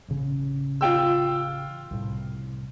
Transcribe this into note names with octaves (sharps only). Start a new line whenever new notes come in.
A1 C#3 C#4
F4 G5 E6
C2 A2